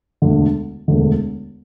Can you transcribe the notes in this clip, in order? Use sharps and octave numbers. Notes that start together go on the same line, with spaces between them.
E1 D2 D3
E1 D2 D3